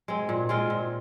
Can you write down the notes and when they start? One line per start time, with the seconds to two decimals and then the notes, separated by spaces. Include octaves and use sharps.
0.08 G#3 C4
0.29 A#2
0.49 G#3 C4 F4
0.70 A#2